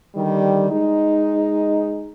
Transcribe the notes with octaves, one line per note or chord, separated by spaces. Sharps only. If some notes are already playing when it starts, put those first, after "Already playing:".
D3 D#3 G3
G#3 D#4